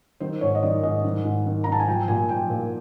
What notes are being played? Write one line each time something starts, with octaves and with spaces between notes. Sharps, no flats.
D#3 C5
G#2 C#5
D#5
D#3 D5
G#2 D#5
D#3
G#2
D#3
G#2 A#5
A5
G#5
F3 G5
A#2 G#5
F3 G5
A#2